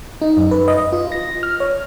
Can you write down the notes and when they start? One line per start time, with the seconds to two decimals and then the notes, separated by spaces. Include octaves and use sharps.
0.22 D#4
0.37 F#2
0.51 B4
0.68 D#5
0.92 F4
1.12 A#6
1.43 F6
1.60 C#5